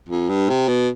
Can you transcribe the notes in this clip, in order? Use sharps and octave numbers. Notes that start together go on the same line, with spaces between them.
F2
G2
C3
B2